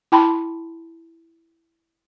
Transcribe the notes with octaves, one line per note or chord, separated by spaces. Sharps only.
E4 G5 A5 B5 C6